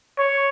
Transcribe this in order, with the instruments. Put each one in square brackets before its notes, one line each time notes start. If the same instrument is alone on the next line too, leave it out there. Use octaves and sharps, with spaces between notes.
[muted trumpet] C#5